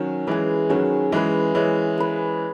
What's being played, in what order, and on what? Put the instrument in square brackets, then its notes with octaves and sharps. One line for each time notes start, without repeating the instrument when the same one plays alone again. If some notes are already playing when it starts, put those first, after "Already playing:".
Already playing: [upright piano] D#3 F#3 [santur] C#4
[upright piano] E3 G#3 [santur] G#4 B4
[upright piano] D#3 F#3 [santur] C#4
[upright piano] E3 G#3 [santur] G#4 B4
[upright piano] E3 G#3 [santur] C#4
[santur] G#4 B4